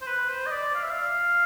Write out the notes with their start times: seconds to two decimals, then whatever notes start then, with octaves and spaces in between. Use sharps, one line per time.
0.01 C5
0.07 B4
0.29 C5
0.46 D#5
0.51 D5
0.75 F5
0.83 E5
0.91 F5